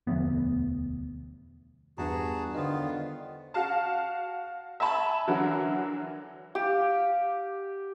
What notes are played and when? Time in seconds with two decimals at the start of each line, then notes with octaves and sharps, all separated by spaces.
0.07 E1 D2 F3 B3
1.98 E2 G2 F#4 G#4 A5 A#5
2.54 D3 D#3 B3 F4 C5 D#5
3.54 F#4 F5 A5
4.80 E5 G#5 A5 B5
5.27 D3 E3 F#3 A#4 F#5
6.55 G4 F5